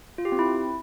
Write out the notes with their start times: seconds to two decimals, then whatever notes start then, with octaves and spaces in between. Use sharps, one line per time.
0.18 F4
0.25 G4
0.32 C4
0.39 E4